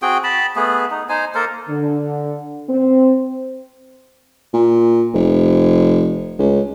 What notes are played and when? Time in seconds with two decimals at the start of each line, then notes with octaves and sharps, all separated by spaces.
0.02 C4 F#4 G#4 G5
0.24 A5 B5
0.56 A3 B3 G#4
0.91 D#4
1.09 D#4 C5 G#5
1.35 A#3 A4 A#4 C5
1.68 D3
2.69 C4
4.54 A#2
5.14 F1
6.39 C#2